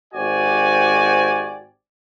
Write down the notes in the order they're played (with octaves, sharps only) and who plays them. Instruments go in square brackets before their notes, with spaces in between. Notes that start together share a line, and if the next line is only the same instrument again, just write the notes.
[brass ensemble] G#1 F#4 G4 C5 D5 G#5